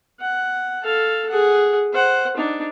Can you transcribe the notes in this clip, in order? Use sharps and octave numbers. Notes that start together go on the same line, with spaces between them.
F#5
A4 F5
G#4 F#5
C5 F#5
D4 D#4